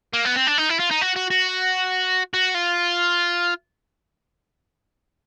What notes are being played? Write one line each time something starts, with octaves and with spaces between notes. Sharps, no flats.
A#3
B3
C4
D4
D#4
E4
F4
D#4
F#4
F#4
F#4
F#4
F4